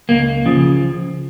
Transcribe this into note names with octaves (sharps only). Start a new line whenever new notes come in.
C#2 A#3
C#3 F3